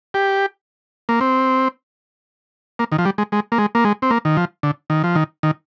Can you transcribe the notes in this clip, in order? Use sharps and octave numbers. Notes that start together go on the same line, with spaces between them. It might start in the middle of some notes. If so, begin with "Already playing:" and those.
G4
A#3
C4
A#3
D#3
F3
G3
G#3
G#3
A#3
G#3
A#3
G#3
C4
A#3
D#3
F3
D3
D#3
F3
D#3
D#3